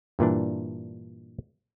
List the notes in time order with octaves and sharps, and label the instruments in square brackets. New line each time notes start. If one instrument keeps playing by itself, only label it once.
[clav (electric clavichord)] G2 A#2 E3 D4